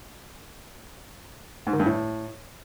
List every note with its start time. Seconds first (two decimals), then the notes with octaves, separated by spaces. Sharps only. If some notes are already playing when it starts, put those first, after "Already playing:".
1.67 G#2
1.73 D#3
1.80 G2
1.86 A2